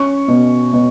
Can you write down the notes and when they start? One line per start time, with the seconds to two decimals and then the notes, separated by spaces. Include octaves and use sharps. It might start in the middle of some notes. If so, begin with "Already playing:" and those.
Already playing: C#4 C#6
0.28 B2
0.73 B2